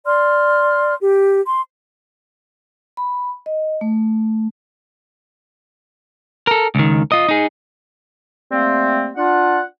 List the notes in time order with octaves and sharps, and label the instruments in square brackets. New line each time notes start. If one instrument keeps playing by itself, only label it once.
[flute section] D5 C6 F6
G4
C6
[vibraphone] B5
D#5
A3
[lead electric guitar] A4 A#4
C#2 D#3
F4 D#5
D#4 G#4
[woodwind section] G3 A3 A#3 C4
D4 F4 F#5